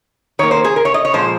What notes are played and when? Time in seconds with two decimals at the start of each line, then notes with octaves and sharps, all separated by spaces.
0.39 D#3 C#5
0.43 A#3
0.51 C5
0.65 G#4
0.76 A#4
0.85 C#5
0.94 D#5
1.05 C#5
1.13 A#2 F3 G#3 C5